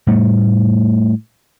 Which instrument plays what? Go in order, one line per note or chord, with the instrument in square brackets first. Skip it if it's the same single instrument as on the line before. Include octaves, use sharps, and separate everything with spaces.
[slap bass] A2 G3 A3